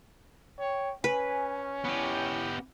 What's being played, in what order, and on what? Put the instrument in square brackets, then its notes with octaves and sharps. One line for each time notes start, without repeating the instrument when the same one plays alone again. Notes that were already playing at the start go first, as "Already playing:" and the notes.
[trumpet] C#5 [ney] G5
[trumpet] C#4 [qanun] B4 [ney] G#5
[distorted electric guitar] B3 G4 [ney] E4